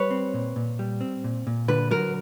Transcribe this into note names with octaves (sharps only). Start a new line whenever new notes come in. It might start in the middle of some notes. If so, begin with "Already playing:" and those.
Already playing: G3 B4 C#5
C4
A#2
A#2
G3
C4
A#2
A#2
D3 B4
F#3 A#4